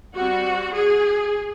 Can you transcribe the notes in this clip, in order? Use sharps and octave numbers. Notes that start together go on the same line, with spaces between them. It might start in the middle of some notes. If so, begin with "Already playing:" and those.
G3 C4 F#4
G#4